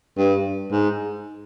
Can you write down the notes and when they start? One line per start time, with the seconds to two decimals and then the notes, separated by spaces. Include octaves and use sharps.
0.18 G2
0.72 G#2